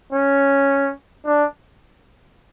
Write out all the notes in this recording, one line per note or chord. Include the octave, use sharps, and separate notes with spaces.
C#4
D4